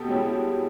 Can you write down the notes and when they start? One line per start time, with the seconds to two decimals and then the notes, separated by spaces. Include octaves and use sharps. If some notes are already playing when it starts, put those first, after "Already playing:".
Already playing: B2 G4 A4
0.09 G#3 C#4 E4